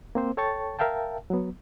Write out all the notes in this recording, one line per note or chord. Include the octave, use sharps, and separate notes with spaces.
A#3 C4 C5
A4 C#5 G5 A5 C#6 A6
A#4 E5 F5 G5 A5
F#3 B3